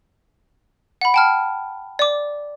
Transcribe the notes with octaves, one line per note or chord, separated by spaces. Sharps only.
F#5 B5
G5 A5 F6
D5 D6